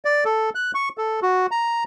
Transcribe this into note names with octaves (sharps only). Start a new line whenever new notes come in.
D5
A4
F#6
C#6
A4
F#4
A#5